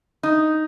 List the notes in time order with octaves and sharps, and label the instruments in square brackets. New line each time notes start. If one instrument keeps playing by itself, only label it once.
[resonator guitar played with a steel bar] D#4